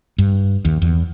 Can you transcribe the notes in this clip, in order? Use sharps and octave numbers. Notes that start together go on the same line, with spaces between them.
G2
D#2
E2